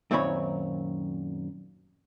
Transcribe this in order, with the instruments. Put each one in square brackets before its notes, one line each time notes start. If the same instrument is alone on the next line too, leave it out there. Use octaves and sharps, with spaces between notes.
[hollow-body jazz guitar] F#2 A#2 D#3 C4 C#5 B5